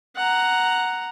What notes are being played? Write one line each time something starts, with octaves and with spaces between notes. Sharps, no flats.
F#5 A#5